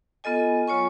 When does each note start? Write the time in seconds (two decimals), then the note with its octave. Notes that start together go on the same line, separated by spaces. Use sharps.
0.24 B3 F4 A4 D#5 G#5
0.68 F#3 F4 C#5 G#5 C#6